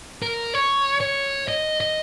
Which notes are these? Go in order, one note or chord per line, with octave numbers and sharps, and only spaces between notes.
A#4
C#5
C#5
D#5
D#5